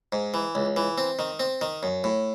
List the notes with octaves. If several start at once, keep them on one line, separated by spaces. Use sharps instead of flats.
G#2
E3
C#2
E3
C4
D#3
C4
D#3
F#2
A2